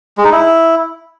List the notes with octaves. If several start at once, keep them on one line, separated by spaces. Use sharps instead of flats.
G#3
D#4
E4